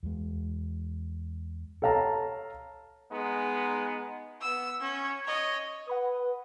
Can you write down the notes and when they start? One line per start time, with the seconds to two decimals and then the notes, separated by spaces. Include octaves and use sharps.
0.03 E2 G#3
1.82 A4 C#5 F5 A5 A#5
3.11 G#3 B3 D#4
4.41 B3 E6
4.80 C#4
5.25 C#5 D#5
5.88 B4 F#5 B5 D#6